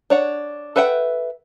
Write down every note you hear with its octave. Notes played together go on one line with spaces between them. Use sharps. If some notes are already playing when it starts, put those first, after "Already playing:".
D4 C#5 F#5
A4 B4 E5 F#5 G5